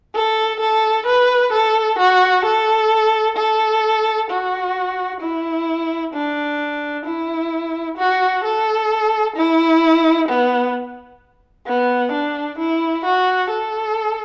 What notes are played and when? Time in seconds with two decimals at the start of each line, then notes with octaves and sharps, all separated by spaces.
0.15 A4
0.60 A4
1.07 B4
1.52 A4
1.99 F#4
2.45 A4
3.37 A4
4.30 F#4
5.21 E4
6.14 D4
7.05 E4
7.97 F#4
8.44 A4
9.36 E4
10.28 B3
11.66 B3
12.12 D4
12.59 E4
13.05 F#4
13.50 A4